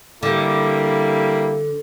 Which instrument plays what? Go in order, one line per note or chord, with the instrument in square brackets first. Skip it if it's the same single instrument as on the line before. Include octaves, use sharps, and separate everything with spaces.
[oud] D3 [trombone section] G3 A#3 E4